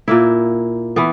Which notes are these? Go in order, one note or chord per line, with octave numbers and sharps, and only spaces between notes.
A#2 A#3 E4
E3 B3